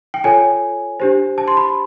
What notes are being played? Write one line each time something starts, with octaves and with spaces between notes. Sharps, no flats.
G5
F4 A4 C#5 G#5
D4 G4 C5
A5
C6
B5